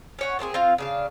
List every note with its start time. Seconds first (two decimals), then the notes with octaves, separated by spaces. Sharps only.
0.19 C#4 C#5 F#5
0.39 A#2 C4 D4 G#4
0.54 C4 F4 F5
0.78 C#3 D4 F5